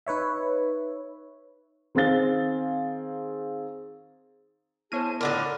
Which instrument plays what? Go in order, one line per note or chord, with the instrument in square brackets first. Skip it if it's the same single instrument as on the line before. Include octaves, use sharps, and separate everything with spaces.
[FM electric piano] D#4 B4 C#5 E5
[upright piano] D#3 C4 G#4 F5 A6 G7
[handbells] B3 E4 [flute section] G#4 A5 [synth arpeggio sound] C5 C#5 D#7
[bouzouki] A2 D3 F4 [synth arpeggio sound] A#4 [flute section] D5 D6 [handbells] B5